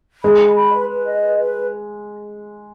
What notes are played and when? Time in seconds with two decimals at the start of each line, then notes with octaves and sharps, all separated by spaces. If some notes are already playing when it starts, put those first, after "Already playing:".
0.23 G#3 B5
0.40 D#5
0.55 B5
0.72 B4
0.88 B4
1.04 D#5
1.21 B4
1.37 B4